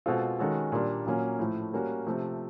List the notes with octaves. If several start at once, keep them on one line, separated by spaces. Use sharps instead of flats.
B2 G#3 C4 F4 A4
D#3 G#3 C#4 F#4 A4
A#2 G3 A#3 D4
A#2 F#3 A#3 C#4
A2 F3 A3
G3 A#3 C#4 F#4
C3 F3 A3